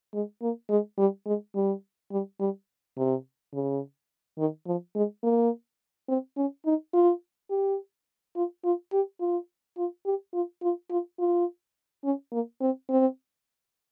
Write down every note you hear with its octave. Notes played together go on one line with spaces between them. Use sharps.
G#3
A#3
G#3
G3
G#3
G3
G3
G3
C3
C#3
D#3
F3
G#3
A#3
C4
C#4
D#4
F4
G4
F4
F4
G4
F4
F4
G4
F4
F4
F4
F4
C#4
A#3
C4
C4